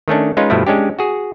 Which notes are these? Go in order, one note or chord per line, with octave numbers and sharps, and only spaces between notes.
D#3 A3 C#4 D4
G#3 C#4 D#4 F4 B4
G2 B2 F3 A3 E4
G#3 C#4 D4 G4
F#4 G#4